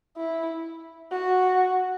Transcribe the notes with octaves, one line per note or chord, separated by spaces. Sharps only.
E4
F#4